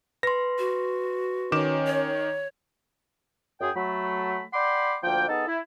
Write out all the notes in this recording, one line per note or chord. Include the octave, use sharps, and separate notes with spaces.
B4 C6 A#6
F#4
D#3 C#4 D6 E7
C#5
F#2 G#4 G5
F#3 A3 B5
D5 F#5 G5 B5 C6 D6
D2 F3 A#3 G5
B3 D#4 G#4 A4
E4